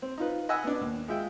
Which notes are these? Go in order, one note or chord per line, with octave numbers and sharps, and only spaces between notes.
C4
D#4 F4 B4
D#5 F#5 G#5 B5 E6
B3 D4
D#2
G#3 F4 E5 G5